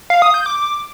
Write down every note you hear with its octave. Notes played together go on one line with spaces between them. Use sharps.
F5
D#6
G6
D6